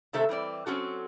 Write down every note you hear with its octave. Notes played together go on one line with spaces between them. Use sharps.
C3 D#3 A3 A4 C5 E5
E3 G3 C4 D5
F#3 C4 C#4 F#4 A4